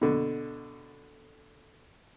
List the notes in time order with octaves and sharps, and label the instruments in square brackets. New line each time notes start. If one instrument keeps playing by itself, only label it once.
[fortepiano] B2 D3